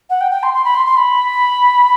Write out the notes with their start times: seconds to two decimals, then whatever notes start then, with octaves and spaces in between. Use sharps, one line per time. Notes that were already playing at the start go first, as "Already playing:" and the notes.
0.10 F#5
0.21 G5
0.32 G5
0.43 C6
0.54 C6
0.65 B5
0.75 C6
0.86 C6
0.97 B5